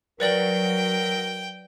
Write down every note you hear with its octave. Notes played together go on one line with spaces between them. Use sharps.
F#3 A#4 B4 D5 G5 F#7